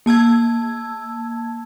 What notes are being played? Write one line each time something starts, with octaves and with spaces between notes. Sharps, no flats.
A#3 A5 E6 G#6